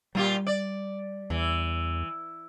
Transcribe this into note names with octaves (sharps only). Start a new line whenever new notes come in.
A#2 G3 F4 G4
D5
E2 E3